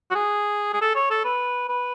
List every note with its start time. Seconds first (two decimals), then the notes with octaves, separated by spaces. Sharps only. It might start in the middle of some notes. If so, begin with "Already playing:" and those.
0.11 F#4
0.15 G#4
0.73 G#4
0.82 A4
0.96 C#5
1.11 A4
1.25 B4
1.69 B4